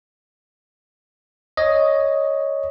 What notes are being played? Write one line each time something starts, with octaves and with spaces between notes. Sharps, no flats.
C#5 D#5